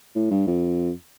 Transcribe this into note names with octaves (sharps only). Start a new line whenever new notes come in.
A2
G2
F2